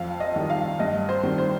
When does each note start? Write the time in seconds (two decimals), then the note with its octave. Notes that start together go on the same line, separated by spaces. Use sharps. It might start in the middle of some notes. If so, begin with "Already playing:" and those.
Already playing: F2 F5
0.20 D#5
0.36 D#3 G3
0.50 F5
0.79 G2 D#5
1.09 C5
1.23 D#3 G3
1.38 C5